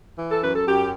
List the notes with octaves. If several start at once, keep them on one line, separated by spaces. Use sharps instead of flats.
E3
A4
F#2 B4
A4
F#2 G4